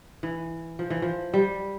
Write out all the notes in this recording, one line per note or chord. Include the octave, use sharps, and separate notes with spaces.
E3
F3
E3
F3
G3